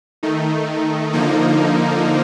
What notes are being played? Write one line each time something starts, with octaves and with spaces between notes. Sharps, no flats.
D#3 A3 D#4
D3 F3 A#3 D#4